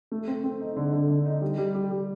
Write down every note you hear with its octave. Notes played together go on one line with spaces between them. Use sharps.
A3
C4
C4
D#4
D3
D3
D3
D#4
G3
G3
G3
G3